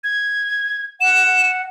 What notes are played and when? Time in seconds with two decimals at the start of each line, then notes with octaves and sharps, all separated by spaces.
0.04 G#6
1.01 F#5 E7